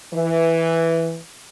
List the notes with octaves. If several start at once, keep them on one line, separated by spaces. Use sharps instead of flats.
E3